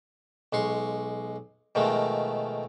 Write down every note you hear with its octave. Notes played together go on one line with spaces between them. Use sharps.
B1 G#3 C6 C#6
B2 D#3 F3 G#3 A3